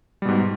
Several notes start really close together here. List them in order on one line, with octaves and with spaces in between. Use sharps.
G3 B2 G#2